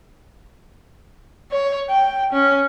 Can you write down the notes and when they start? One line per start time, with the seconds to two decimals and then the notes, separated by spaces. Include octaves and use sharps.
1.52 C#5
1.90 G5
2.33 C#4